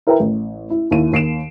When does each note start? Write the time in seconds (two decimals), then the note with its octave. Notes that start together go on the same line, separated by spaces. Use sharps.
0.07 E4 A#4 B4 E5 G5 A#5
0.20 A1
0.70 E4
0.91 D#2 E4 D#7
1.12 D#2 C7 D7 E7